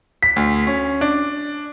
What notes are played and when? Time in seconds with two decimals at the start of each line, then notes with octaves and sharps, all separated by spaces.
0.23 B6
0.36 D2
0.67 C#4
1.01 D4